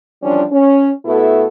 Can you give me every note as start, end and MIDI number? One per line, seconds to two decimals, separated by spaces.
0.23 0.44 52
0.23 0.44 53
0.23 0.44 55
0.23 0.44 61
0.23 0.44 62
0.52 0.91 61
1.06 1.46 47
1.06 1.46 57
1.06 1.46 59
1.06 1.46 64
1.06 1.46 66
1.06 1.46 69